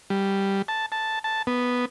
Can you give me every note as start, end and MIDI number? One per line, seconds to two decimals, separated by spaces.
0.10 0.62 55
0.68 0.86 81
0.92 1.19 81
1.24 1.42 81
1.47 1.85 59